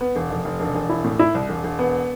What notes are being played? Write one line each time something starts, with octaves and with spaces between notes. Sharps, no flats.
B3
E1
F1
F1
E1
E1
E4
A2
E4
C2
E1
E1
B3